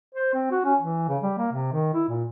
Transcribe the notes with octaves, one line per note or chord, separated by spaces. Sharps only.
C5
C4
F#4
C#4
E3
C#3
G3
A#3
C3
D#3
E4
A#2